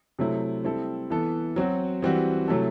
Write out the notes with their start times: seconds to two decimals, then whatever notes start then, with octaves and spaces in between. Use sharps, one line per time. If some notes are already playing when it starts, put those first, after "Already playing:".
0.19 C3 F#3 A3 C4 E4
0.64 G3 C4 E4 A4
1.10 E3 B3 E4 A4
1.56 F#3 C4 F#4
2.02 E3 G3 C4 F#4
2.48 C3 F#3 A3 E4 A4